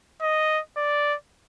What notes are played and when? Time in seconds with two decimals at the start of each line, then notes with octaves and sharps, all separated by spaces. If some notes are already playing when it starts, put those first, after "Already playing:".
0.22 D#5
0.77 D5